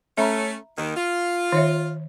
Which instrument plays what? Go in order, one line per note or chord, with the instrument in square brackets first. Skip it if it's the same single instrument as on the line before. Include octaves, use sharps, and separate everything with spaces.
[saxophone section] A3 C#4 [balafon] E5 A#5 B5
[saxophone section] D#2 D#3
F4
[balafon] D#3 C#5 E5